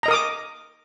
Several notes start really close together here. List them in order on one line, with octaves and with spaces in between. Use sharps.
A#5 D#5 A#4 D#6 D6